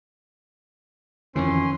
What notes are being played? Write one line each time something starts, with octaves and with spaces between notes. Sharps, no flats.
F2 D#3 E3 C#4 C6